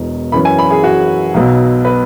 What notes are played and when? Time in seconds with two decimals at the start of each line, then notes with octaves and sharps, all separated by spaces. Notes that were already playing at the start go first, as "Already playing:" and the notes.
Already playing: E1 E2 B2
0.32 F#2 E3 C#4 B5
0.45 G#5
0.59 B5
0.70 G#4
0.84 F#4
1.34 B1 B2 F#3
1.85 B4